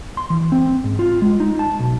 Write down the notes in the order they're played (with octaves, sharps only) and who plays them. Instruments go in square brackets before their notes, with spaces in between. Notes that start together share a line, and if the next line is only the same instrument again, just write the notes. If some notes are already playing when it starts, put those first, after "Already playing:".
[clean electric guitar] C6
E3
C4
G#2
F4
G#3
D#4
A5
B1